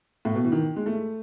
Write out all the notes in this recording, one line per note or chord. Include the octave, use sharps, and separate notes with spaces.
A2
B2
E3
D#3
G#3
A3